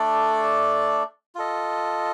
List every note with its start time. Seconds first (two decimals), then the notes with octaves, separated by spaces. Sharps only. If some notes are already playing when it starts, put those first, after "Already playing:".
Already playing: A3 D4 A4 D5
1.35 F4 A4 D#5